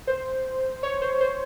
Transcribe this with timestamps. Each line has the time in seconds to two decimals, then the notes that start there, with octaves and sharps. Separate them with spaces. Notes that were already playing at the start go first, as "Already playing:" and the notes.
0.07 C5
0.83 C#5
1.02 C5
1.21 C5